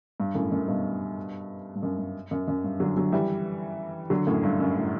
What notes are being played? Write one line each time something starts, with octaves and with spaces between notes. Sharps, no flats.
G2
F#2 A2
F#2 A2
G2 B2
G2
F#2
G2
F#2
F#2
G2
D3 F#3
D3 F#3
E3 G3
D3 F#3
F#2 A2
G2
F#2
A2